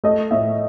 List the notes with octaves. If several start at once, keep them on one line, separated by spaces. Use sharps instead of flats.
A3 D#5
A2 E5